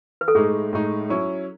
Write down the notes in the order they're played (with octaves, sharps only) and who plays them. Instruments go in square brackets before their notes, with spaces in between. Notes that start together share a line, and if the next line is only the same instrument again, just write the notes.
[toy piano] B4
A4
[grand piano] A2 G#3 D#4 [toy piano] G#4
[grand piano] A2 G#3 D#4
F#3 C#4 E4